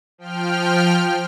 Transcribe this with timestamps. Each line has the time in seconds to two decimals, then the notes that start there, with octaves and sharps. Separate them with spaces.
0.18 F3 G5 F6